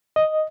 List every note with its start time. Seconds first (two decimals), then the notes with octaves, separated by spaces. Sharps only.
0.16 D#5